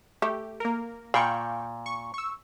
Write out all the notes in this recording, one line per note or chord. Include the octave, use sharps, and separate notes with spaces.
A3 G4
A#3 A#4
A#2 F5 G5 B5 C#6
C#6
C#6 E6